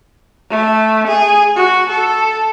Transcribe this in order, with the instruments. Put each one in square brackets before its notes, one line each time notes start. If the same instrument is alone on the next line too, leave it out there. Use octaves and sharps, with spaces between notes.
[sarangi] A3
G#4
F#4
A4